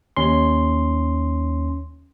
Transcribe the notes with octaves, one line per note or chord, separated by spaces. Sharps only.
D#2 C#4 C6